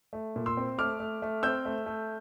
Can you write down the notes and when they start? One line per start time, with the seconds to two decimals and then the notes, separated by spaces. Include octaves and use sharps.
0.13 A3
0.36 A#2
0.46 C6 E6
0.57 C4
0.78 A3 D6 F6
1.00 A3
1.22 A3
1.43 C4 E6 G6
1.65 A3
1.86 A3